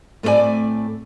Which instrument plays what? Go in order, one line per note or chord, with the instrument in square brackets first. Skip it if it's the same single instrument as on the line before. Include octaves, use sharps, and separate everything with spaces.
[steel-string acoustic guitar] A2 A3 C4 F4 D5 G#5